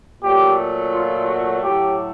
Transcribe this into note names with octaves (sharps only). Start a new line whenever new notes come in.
A#2 F#3 A3 G4
F4
F#4
A2 F#3 A3 G4